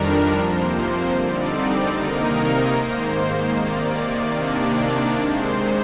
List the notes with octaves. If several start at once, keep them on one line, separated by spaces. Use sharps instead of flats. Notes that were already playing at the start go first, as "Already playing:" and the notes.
Already playing: F2 D#3 G3 D4 A#4
C3 F3 A#3 C5
C5
D3 G3 C4 D#4 D5
C3 D#3 A#3 D#4 A#4
G#2 D#3 A#3 C5
C3 D#3 A#3 D5
C3 D#3 A#3 D4
C3 D#3 G#3 C5